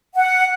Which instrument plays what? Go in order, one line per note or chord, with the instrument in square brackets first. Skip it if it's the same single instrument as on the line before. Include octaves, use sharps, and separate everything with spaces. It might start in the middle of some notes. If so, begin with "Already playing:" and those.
[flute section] F#5